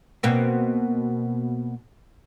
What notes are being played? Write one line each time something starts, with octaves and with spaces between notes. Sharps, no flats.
B2 A#3 C4